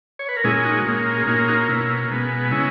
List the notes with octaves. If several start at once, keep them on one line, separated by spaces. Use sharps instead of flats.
C#5
B4
A#4
A#2 G#3 C#4 E4 G#4
D#4 F#4
A#2 A#3 C#4
G#4
A#2 A#3 C#4 D#4 F#4
D#4 F#4
B2 A#3 C#4 E4
B2 G#3 B3
C#3 G#3 C#4 E4